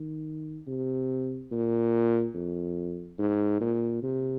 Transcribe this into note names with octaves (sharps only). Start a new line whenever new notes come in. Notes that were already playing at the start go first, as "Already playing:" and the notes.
Already playing: D#3
C3
A#2
F2
G#2
A#2
C3